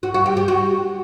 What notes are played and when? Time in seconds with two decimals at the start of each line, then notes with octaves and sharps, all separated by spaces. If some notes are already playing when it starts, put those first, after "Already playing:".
0.03 F#4
0.14 F#4
0.26 G4
0.37 G4
0.48 F#4